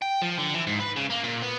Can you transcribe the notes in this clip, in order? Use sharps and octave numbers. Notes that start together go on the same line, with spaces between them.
G5
F3
D3
E3
G#2
B4
C#3
A#3
A#2
B3